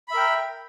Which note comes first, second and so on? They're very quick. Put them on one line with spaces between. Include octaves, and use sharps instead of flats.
B5 E5 A#4 G5